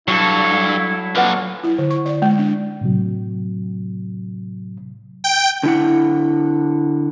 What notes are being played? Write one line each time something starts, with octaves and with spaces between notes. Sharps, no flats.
G2 F#3 E4 A4
A#2 D4 F4 B4 F#5
E4
D3
C#6
D5
G#3
D4
A2 C3 F#3
G5
D3 E4 F#5